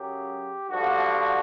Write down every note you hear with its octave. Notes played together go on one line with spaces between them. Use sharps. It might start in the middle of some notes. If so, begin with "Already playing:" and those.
Already playing: F#2 C#3 F#3 G4
G2 D3 F3 F#4